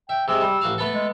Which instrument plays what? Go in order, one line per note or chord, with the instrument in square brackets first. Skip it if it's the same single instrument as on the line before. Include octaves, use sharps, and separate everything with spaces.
[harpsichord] E5 [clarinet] G5
[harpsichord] C3 G#3 [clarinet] E6
[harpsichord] G3
A1 F#4 F5
A3 B3 A4
[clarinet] G#3